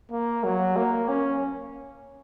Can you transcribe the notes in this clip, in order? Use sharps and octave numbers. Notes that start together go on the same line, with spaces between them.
A#3
F#3
A#3
C#4